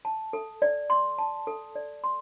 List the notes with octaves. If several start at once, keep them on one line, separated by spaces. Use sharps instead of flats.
A5
A4
D5
C6
A5
A4
D5
C6